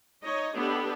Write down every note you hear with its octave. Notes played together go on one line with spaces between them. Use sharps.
D#4 C#5 D#5
B3 D4 G4 A4